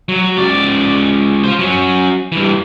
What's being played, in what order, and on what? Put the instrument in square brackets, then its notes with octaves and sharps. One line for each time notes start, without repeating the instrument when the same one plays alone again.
[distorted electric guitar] F#3
C#2 D5
F4 C5
F#3 C#4
G2 E3